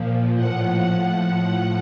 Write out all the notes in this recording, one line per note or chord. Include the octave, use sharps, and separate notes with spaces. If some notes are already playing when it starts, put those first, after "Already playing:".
Already playing: A#2 F3
A2 F3 F#5
A2 F3 F#5